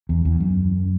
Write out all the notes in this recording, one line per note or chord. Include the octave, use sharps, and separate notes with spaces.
E2
E2
F#2